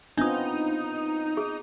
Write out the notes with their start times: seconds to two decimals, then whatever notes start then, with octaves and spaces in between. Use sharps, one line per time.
0.17 B3 C4 D4 D#4 F4 D#6
1.37 G#4